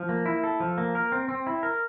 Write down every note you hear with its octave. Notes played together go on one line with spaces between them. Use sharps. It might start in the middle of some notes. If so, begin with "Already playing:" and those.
Already playing: F3
A#3
E4
A4
F3
A#3
A#4
C4
C4
E4
A#4